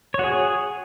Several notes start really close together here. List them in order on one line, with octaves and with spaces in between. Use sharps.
C#5 F#4 G#4